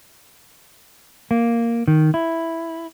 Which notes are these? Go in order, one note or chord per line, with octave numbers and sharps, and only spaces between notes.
A#3
D#3
E4